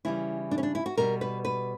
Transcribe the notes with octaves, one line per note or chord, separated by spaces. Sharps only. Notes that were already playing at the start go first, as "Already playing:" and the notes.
C#3 E3 G3 E4
D4
C#4
D4
E4
F#4
B2 G3 A#4
B4
B4